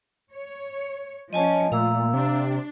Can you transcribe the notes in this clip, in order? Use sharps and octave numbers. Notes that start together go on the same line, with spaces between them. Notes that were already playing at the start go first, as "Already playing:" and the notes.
C#5
F3 C#4 D#5 G#5 A5
A#2 A3 F5 A#5 E6
C3 D4